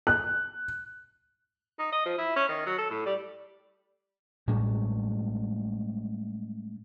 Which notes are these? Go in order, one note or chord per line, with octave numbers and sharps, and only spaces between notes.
F#6
D#4
D#5
F3
E4
C#4
D#3
F#3
A4
A2
G3
A2 G3 G#3 C#4